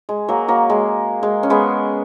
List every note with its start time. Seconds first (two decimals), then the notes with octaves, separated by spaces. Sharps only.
0.09 G#3
0.29 F#3 A#3
0.48 F#3 A#3
0.70 G#3
1.23 G#3
1.43 C#4
1.50 G#3 B3